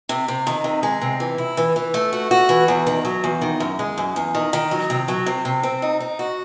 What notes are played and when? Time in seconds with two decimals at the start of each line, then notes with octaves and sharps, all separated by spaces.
0.09 C3
0.28 C3
0.47 D#3
0.64 C3
0.83 G#3
1.02 C3
1.20 E3
1.38 E4
1.57 E3
1.76 E3
1.94 A3
2.13 F#4
2.31 F#4
2.49 E3
2.68 E2
2.87 D#3
3.05 F#3
3.24 E2
3.41 D#3
3.60 F#2
3.79 G#3
3.98 F#2
4.16 E2
4.35 D#3
4.53 D#3
4.71 F#3
4.90 C3
5.08 F#3
5.26 C3
5.45 C3
5.63 C4
5.82 D#4
6.00 D#4
6.19 F#4